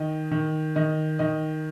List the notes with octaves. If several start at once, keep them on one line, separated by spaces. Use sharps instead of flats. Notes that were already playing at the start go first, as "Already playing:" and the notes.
Already playing: D#3 D#5
D#3
D#3 D#5
D#3 D#5